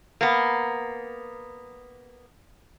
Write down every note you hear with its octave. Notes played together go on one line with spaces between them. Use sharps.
A#3 B3